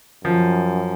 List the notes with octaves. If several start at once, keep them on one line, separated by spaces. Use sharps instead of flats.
F#2 F3